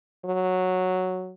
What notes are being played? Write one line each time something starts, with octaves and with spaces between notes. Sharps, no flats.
F#3